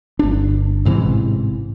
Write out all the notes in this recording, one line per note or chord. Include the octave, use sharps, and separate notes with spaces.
G1 D4
A1 G#2 C3 E3